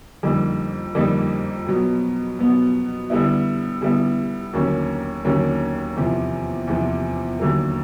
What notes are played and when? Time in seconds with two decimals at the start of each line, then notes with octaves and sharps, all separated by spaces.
0.23 F2 D3 G3 A#3 D#4
0.95 F2 D3 G3 A#3 D#4
1.67 B2 F#3 B3
2.39 B2 F#3 B3
3.10 D3 G3 B3 E4
3.81 D3 G3 B3 E4
4.53 D#2 D3 F#3 A#3 C#4
5.24 D#2 D3 F#3 A#3 C#4
5.97 E2 C3 F3
6.68 E2 C3 F3
7.40 D#2 D3 F#3 A#3